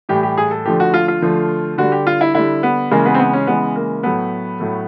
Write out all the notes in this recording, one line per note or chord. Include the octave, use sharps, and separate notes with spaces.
A2 E3 G3 G4
G4
G#4
A4
D3 F3 A3 G4
F#4
F4
F4
D3 F3 A3
D3 G3 F#4
G4
F4
E4
D3 G3 E4
B3
C#3 E3 G#3 A#3
B3
C4
B3
C#4
C#3 E3 G#3 B3
A#3
A2 F#3 A3 B3
A2 F#3 A3